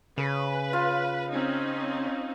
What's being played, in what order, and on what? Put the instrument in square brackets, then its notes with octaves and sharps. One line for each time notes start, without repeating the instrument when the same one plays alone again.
[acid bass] C#3 [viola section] B4
[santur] F4
[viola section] C4 C#4 D#4